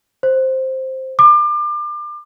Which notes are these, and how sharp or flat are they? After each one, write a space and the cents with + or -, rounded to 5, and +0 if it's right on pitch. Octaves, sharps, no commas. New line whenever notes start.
C5 +5
D6 +30